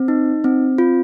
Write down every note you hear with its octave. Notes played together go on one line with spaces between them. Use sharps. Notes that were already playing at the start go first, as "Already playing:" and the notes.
Already playing: C4
D#4
C4
F4